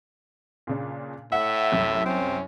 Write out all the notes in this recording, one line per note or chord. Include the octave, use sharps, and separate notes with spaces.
A#2 C#3 D4
A2 E5 F#5
C2 F#2
C4 C#4